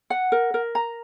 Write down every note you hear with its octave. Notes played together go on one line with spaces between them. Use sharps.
F#5
A#4
A#4
A#5